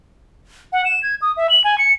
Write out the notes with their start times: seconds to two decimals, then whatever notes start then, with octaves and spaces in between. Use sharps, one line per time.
0.72 F#5
0.85 E7
1.03 G#6
1.22 D#6
1.37 E5
1.50 F#7
1.64 G#5
1.78 C#7